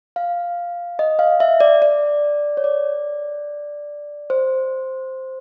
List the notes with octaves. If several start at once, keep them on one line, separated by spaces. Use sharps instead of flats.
F5
D#5
F5
E5
D5
D5
C#5
D5
C5